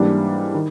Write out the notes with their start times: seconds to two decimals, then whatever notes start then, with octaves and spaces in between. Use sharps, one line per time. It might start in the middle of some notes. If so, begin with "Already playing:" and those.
Already playing: G#2 E3 G3 A#3 D4
0.55 D#3